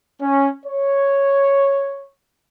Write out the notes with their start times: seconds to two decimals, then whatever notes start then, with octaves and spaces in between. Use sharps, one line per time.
0.20 C#4
0.66 C#5